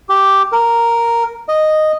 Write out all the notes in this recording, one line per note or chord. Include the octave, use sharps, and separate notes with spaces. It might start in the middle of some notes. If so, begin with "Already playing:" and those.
G4
A#4
D#5